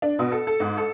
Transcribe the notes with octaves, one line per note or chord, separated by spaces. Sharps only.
D4
B2
A4
A4
G#2
A4